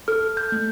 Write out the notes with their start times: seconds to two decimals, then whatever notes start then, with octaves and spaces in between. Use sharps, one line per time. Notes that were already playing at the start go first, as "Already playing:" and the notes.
0.08 A4 F6
0.37 G6
0.52 A3